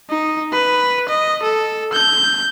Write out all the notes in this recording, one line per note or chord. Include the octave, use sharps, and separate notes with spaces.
D#4
B4
D#5
A4
G6